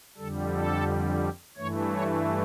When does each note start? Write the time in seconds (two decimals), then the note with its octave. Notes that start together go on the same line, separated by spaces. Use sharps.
0.17 F2 D3 G3 A4
0.53 A4
1.57 G2 E3 A3 C#5
1.93 C#5